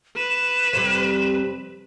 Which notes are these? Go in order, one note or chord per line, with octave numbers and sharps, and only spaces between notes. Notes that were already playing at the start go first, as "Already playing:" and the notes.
B4 E7
F2 C3 G3